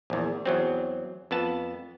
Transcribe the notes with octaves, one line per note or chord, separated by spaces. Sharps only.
A#1 E2
E2 F#3 C4
F2 B3 A5